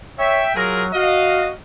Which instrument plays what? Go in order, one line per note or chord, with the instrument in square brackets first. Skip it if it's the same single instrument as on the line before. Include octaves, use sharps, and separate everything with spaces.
[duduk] C#5 [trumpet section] E5 G5
[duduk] F#3 [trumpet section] F4 G#4 A#4
[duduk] F#4 [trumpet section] D#5 F5